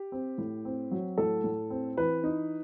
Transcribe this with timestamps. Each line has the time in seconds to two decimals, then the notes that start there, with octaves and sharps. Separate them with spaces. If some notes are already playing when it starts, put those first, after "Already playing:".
Already playing: G4
0.12 C4
0.38 A2
0.65 C4
0.91 F#3
1.18 A2 A4
1.44 A2
1.70 C4
1.97 E3 B4
2.24 D#4